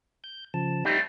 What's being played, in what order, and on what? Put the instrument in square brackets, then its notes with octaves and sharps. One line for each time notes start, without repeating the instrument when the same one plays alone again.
[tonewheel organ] G6
C#3 F3 A5
[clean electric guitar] G3 A3 C4 [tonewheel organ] D#4 G4